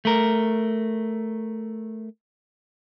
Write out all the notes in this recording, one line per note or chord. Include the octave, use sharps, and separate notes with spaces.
A3 A#4